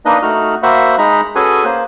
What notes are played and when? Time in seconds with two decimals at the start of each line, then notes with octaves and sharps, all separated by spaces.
0.05 A#3 D4 D#4 B4 D#5
0.22 A3 D#4 F#4 F6 F#6
0.63 A#3 F#4 C5 E5 F#5 B5
0.98 G#3 D#4 A#5 B5
1.35 C#4 F#4 G#4 A4 B4 G#5
1.65 A#3 C5 F#6